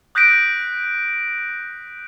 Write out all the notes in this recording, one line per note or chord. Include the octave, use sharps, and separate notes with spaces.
D#6 F#6 G6 A#6 B6 D7